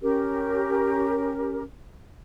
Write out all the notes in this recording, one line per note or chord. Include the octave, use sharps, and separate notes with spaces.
C#4 G4 A#4